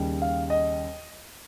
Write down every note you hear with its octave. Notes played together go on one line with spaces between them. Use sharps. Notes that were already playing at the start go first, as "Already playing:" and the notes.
Already playing: D#2 C#3 G3
F5
D#5